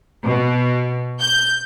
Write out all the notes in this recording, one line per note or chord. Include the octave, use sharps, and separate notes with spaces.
B2
G6